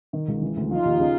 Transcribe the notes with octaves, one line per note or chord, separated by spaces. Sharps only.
D#3
C#2
E3
D2
F3 D#4 F4
D#2
C#3